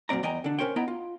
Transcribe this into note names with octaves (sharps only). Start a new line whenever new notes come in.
F#2 A#2 C4 D5 A#5
E2 D#5 G5 G#5 A#5
D3 D4
C#4 A#4 C5 C#5 G5
B3 E4 D#5 G5 A#5
F4